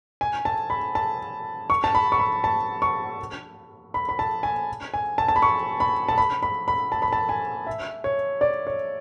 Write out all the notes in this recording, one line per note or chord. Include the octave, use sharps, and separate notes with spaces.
G#5
A5
B5
A5
C#6
A5
B5
C#6
B5
A5
C#6
B5
B5
A5
G#5
G#5
A5
A5
B5
C#6
B5
A5
B5
B5
B5
A5
B5
A5
G#5
E5
C#5
D5
C#5